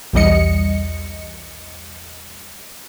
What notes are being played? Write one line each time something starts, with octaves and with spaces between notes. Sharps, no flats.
B1 E2 G3 D#5 C#7